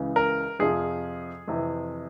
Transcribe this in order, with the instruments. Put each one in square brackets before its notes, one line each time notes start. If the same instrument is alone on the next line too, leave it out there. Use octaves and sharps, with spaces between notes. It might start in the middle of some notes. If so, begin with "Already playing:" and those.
Already playing: [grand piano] C#2 C#3 E3
A#4
F2 C3 F3 G#4
F2 C3 E3